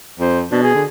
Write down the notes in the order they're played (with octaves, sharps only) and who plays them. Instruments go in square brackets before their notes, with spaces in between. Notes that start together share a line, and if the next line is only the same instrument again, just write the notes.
[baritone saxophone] F2 [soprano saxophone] C5
[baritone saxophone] B2 [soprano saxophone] D4
[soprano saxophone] G#4
[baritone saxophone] D3